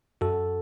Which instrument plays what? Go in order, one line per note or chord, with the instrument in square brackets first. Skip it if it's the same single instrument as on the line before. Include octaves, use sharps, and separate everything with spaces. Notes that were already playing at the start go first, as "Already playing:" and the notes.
[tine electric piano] F#2 F#4 A4